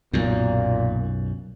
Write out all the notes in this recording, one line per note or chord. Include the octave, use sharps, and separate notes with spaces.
B1 F#2 A#2